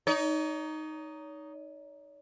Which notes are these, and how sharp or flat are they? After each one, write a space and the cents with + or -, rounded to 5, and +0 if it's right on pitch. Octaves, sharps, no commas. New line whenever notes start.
D#4 +0 C#5 +40